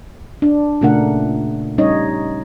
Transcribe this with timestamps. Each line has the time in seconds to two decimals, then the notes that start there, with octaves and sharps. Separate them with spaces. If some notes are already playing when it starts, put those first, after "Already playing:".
0.42 D4
0.81 A#2 C#3 A3 D4 A#4 F#5
1.78 G3 C#4 D#4 C#5 D#5